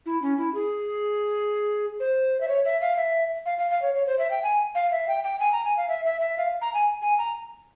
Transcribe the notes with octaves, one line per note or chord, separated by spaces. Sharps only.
E4
C#4
E4
G#4
C5
E5
C#5
E5
F5
E5
F5
F5
F5
C#5
C#5
C5
E5
G5
G#5
F5
E5
G5
G5
G#5
A#5
G#5
F5
E5
E5
E5
F5
A#5
G#5
G#5
A#5